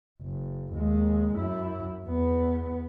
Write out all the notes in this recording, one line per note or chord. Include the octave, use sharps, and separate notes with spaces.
F#1
D#2 G#3
F#2 E4
E2 B3